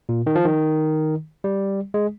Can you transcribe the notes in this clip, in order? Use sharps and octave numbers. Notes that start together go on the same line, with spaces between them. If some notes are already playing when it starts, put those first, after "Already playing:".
A#2
D#3
F3
D#3
G3
G#3